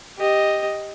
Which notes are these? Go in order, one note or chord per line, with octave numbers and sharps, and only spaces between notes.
G4 D#5